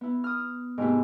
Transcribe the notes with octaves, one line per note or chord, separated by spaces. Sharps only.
B3 E4
D#6 F6
G#2 C3 G#3 A3 B3 E4